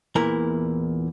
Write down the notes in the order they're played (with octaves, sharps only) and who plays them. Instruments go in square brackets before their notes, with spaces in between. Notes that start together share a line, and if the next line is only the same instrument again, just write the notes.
[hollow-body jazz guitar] E2 A#2 E4 A#4 A#5